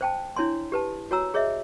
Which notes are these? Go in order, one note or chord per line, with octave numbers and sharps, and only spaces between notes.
C5 G5 A5
D4 E4 C#5 G#5 C6
G4 B4 A5
F#4 C#5 G#5 A#5 E6
G#4 C#5 D#5 E5